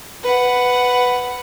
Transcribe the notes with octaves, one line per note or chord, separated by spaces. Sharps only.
B4 F#5